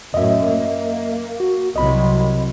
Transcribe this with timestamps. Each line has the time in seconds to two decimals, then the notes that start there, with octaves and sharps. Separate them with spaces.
0.14 F#2 A2 D#5 E5
0.46 A#3
1.40 F#4
1.76 C2 C3 F#3 D#5 B5